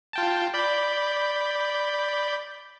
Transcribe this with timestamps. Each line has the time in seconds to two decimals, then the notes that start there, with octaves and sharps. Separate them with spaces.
0.13 F4 G5 A5
0.54 D5 B5 G6